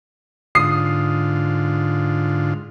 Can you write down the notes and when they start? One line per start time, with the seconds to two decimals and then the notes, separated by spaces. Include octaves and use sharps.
0.55 G#2 D3 F4 D#6 C7